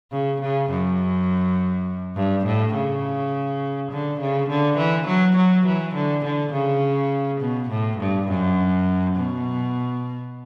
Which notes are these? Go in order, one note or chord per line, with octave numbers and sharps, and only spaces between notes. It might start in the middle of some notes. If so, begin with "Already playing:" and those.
C#3
C#3
F#2
G2
A2
C#3
D3
C#3
D3
E3
F#3
F#3
E3
D3
D3
C#3
B2
A2
G2
F#2
B2